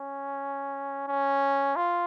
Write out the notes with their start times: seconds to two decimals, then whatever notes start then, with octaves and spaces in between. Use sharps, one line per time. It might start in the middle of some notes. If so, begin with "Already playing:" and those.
Already playing: C#4
1.08 C#4
1.76 F4